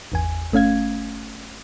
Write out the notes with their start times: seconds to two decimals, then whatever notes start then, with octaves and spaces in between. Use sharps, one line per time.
0.12 G#1 E2 G#5
0.52 G1 A3 C#4 F5 G#6